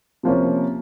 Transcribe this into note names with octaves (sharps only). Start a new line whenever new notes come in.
C3 F3 A#3 C#4